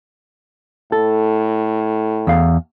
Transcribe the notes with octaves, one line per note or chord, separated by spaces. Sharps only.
A2 A4
E2 F5